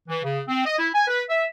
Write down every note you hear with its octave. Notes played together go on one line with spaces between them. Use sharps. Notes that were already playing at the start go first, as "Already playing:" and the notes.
E3
C#3
C4
D#5
E4
G#5
B4
E5